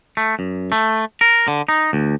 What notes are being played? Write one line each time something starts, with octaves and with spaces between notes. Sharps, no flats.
A3
F#2
A3
A#4
D3
D#4
D2